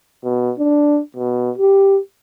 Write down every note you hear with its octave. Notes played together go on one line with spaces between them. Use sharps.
B2
D4
B2
G4